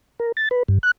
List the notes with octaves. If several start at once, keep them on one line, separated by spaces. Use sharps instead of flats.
A#4
A6
B4
G2
F#6